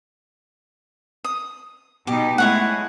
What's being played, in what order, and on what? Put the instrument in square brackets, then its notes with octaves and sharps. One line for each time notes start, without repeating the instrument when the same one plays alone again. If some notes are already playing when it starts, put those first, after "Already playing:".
[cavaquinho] D#6
[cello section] B2 D#4 [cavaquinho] G4
[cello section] G#3 A3 [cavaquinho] E4 C#5 F#5